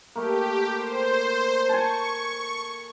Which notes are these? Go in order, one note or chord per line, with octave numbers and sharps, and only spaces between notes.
A3 A#3 G4
C5
G#5 A5 C#6